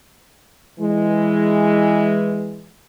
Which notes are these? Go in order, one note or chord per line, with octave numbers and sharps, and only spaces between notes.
E3 G#3